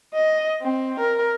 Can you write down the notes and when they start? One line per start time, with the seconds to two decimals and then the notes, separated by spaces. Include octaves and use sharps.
0.15 D#5
0.62 C4
1.00 A#4